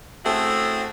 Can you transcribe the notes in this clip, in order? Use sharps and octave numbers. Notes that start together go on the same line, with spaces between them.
A3 C4 C#4 E4 F#4 G#4